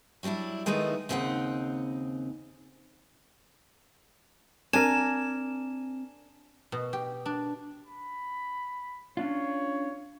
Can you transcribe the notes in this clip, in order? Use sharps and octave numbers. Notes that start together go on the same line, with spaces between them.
F#3 G3 C#4 D4 E4
D#3 G#3 A3 B3 D#4 E4
D#2 C#3 C4 D#4 A4 F#5
C4 D4 A#4 G#5 E7
B2
G4
D4
B5
C#4 D4 F4 C#5